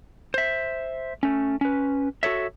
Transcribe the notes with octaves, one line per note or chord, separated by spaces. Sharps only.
C5 E5
A3 C#4
C#4 B4
F#4 A4 C#5 E5